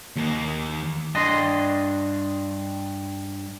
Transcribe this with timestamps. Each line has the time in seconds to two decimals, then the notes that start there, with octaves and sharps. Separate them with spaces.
0.16 D#2 A#3
1.15 G2 D4 D5 D#5 C6 A#6